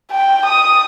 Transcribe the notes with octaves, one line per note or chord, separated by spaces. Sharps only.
G5
D#6